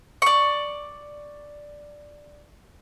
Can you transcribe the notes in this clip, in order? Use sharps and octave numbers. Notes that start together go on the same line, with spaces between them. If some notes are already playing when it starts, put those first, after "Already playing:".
D5 C#6